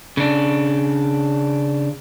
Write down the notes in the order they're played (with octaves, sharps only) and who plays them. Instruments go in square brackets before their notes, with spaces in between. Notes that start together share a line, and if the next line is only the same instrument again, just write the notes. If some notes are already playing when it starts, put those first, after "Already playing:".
[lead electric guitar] C#3 D4